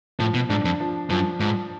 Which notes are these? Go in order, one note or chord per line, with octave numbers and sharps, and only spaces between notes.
A2 F3
B2
G#2 D4
F2
F3
F#2 F3
G#2 F3